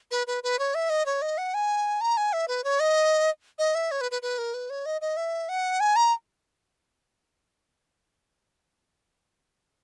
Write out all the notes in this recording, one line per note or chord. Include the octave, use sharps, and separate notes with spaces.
B4
B4
B4
C#5
E5
D#5
C#5
D#5
F#5
G#5
A#5
G#5
E5
B4
C#5
D#5
D#5
E5
C#5
B4
B4
B4
A#4
B4
C#5
D#5
D#5
E5
F#5
G#5
A#5